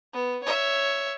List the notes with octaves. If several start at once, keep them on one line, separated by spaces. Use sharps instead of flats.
B3
C#5 E5